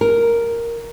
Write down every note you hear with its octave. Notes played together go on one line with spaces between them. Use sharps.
A#4